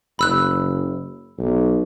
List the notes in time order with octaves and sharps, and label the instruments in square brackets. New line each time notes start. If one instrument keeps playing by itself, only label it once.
[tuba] F#1 [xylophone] B5 E6 F#6
[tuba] B1